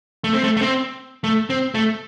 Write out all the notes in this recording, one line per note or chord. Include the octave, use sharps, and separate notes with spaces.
A3
C4
A3
A3
C4
A3
C4
A3